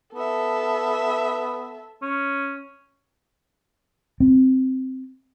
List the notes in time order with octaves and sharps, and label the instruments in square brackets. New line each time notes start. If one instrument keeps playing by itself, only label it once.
[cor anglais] B3 [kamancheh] A4 E5
[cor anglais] C#4
[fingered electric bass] C4